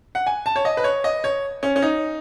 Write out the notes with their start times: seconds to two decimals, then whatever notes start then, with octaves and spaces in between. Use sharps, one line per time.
0.15 F#5
0.27 G#5
0.46 A5
0.56 C#5
0.65 D#5
0.77 B4
0.84 C#5
1.04 D#5
1.24 C#5
1.63 C#4
1.76 C#4
1.82 D#4